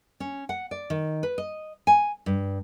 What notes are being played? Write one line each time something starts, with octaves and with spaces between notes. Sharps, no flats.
C#4
F#5
D5
D#3
B4
D#5
G#5
G2